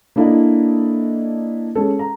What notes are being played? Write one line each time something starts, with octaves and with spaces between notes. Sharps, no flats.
A#3 D4 E4 A4 D5 D#5
G#3 C#4 A4
A#5